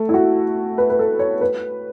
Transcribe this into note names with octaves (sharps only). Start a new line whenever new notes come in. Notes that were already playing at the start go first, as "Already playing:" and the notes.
Already playing: A3
E4
F#4
B4
B4
A4
C#5
B4